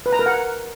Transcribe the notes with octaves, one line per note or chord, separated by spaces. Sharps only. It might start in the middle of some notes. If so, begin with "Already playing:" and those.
B4
A#5
A#4
F#5